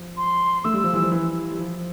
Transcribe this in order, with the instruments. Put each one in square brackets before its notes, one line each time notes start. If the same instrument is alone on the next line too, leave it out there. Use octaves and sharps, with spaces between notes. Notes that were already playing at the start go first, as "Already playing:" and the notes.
Already playing: [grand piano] F3
[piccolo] C6
[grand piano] A3 [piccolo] E6
[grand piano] G3
F3
E3 G3
F3
E3
G3
F3